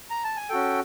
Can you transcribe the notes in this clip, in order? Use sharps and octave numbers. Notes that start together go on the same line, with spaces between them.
A#5
A5
G#5
C#4 F#4 A4 G5